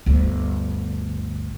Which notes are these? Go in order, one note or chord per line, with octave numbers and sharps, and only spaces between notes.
G1 D2